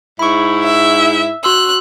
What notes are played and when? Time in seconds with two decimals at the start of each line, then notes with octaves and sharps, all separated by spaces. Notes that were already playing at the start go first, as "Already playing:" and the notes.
0.19 G#2 E4 B5 C#6
0.63 E5
1.44 F#4 C6 E6 F#6